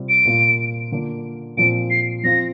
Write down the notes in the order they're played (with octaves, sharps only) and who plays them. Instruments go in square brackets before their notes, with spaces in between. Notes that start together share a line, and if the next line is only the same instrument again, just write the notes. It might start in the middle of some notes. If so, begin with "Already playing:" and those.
Already playing: [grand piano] C3 G3 C4 F4
[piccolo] D7
[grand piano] A#2 A#3 F4
D3 A#3 D4 F4
[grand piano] A#2 F3 C4 [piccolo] D7
[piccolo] C7
[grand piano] F3 C4 F4 [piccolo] A#6